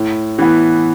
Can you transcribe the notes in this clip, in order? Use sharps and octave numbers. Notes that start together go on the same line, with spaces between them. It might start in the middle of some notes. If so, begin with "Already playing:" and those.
Already playing: A2
E3 B3